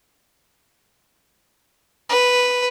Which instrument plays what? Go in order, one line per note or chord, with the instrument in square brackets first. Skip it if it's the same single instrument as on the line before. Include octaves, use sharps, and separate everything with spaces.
[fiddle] B4